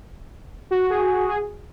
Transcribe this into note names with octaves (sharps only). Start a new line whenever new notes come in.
F#4
G#4
G#4